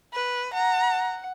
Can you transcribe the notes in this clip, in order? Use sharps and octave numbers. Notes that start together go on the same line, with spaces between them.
B4
F#5 A#5